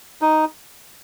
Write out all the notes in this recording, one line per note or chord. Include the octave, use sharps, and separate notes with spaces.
D#4